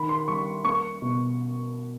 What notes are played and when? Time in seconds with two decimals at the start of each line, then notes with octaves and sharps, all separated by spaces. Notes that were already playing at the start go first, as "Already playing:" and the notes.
Already playing: D#3 B5
0.09 C6
0.28 G3 C#6
0.65 A#3 C#6
1.02 B2